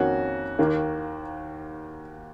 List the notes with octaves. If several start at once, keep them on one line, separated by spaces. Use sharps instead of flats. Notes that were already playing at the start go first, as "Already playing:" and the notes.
Already playing: F2 D#3 A#3 C#4 F#4
D#2 D#3 A#3